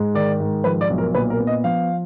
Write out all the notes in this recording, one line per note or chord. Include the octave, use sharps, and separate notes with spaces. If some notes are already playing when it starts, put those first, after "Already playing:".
Already playing: G#2 G#3
D#3 D5
G#2
F3 B4
D5
B1
A#4
A#2 B4
A#4
B3
D#5
F3 F5